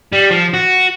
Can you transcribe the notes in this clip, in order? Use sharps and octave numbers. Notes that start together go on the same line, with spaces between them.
G3
F3
F#4